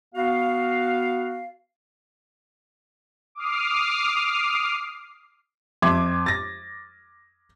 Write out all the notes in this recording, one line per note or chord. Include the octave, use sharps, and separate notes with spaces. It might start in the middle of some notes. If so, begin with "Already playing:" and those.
B3 F#4 F5
D6 D#6 F6 C7
F2 E5 C6 D6 G#6
A6 A#6